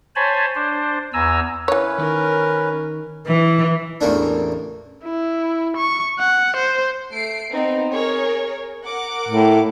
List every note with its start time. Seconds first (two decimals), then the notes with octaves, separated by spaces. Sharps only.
0.16 C5 C#5 G#5 A5 B5
0.55 D4 C5
1.14 E2 G#5 A#5 E6
1.68 E3 C#4 B4 C#5
1.98 D#3 A#4
3.27 E3
4.01 A1 E2 A#3 D4
5.04 E4
5.77 C#6
6.19 F#5
6.57 C5
7.12 A3 C7 D7
7.52 B3 C4 D#4
7.93 G#4 A#4 C#5
8.85 A#4 F#5 D6
9.29 A2